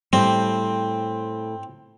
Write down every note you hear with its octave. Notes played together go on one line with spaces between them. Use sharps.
A2 G3 C4 G5